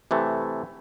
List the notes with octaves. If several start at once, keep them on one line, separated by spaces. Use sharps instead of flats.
C3 E3 A3